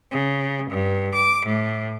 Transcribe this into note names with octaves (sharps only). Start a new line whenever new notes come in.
C#3
G2
D6
A2